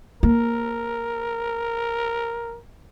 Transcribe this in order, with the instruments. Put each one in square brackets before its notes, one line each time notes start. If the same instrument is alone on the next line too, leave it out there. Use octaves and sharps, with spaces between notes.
[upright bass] A#3 [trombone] A#4